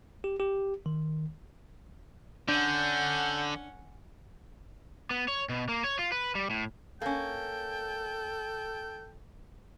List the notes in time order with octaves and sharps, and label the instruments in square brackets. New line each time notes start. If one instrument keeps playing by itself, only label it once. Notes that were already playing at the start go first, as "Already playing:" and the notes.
[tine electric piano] G4
G4
D#3
[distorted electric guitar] D3 [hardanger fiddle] C#4 F#5 [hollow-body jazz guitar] D4 [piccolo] G6
[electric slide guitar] B3
C#5
B2
A#3
C#5
F4
B4
G3
A2
[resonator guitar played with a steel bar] A#3 C#4 [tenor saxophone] A4 [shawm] G5